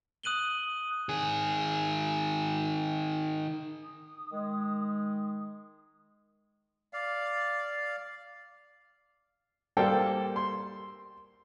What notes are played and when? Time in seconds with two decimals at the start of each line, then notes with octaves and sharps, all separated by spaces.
0.23 D#6 F#6 D#7 F#7 G7
1.09 D#3 G#4
3.84 D#6
4.32 D#3 G#3
6.93 D5 F5
9.77 G3 A#3 A4 C5 G5
10.36 C6